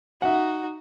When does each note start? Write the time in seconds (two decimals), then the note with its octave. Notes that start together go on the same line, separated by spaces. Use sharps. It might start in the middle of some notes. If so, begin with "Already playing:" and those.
0.22 D#4 F#4 E5 F#5